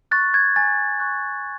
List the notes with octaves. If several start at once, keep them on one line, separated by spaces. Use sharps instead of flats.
C#6 F#6 A6
G#6
G#5 A6
C#6 F#6